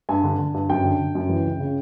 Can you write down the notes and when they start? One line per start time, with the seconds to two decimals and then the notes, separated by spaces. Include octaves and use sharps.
0.09 G2 G#5
0.24 D3
0.39 D3
0.54 G2
0.69 F#2 G5
0.84 D3
0.99 D3
1.15 F#2
1.29 E3
1.45 C#2
1.60 C#3